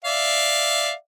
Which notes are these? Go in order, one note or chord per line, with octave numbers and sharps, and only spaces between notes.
D5 E5 F5